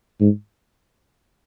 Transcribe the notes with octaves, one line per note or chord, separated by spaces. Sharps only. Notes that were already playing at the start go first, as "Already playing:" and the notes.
G#2